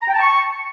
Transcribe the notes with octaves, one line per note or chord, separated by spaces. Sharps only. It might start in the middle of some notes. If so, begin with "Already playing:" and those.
A#5
G5
A5
C#6